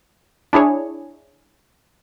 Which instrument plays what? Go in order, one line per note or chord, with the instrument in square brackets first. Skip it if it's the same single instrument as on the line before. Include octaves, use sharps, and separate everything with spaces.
[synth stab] D4 E4 G#4 C#5